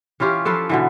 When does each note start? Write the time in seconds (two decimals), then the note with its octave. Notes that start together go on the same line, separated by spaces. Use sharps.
0.20 E3 C#4 F4 G4
0.45 F3 A4 B4 F5
0.69 B2 D3 E3